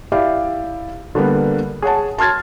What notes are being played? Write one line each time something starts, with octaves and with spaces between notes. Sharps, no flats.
E4 G4 D5 E5 F5
D3 G3 A#3 B3
G#4 C#5 F#5 A5
A5 C6 F6 G#6 A6